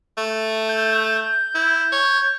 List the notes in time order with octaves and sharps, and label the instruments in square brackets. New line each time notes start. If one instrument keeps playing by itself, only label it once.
[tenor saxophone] A3
[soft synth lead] G6
[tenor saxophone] E4
C#5